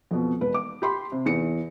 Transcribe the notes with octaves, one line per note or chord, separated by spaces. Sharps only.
F2 B2
E1 B4
D6
G4 B5 C6
C3
E2 C#7